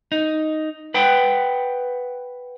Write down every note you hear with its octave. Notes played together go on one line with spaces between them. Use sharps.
D#4
B4 F#5 G5